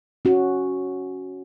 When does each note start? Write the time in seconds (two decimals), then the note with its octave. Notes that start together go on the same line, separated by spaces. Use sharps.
0.25 C#4 F#4